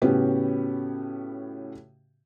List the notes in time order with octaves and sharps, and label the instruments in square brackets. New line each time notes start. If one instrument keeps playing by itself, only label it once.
[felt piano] A2 C#3 B3 C#4 F#4 G4